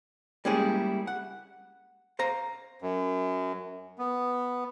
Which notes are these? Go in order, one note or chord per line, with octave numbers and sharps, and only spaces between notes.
G3 G#3 A#3 C#4 E4 G#4
F#5
C5 F5 A#5
F#2
B3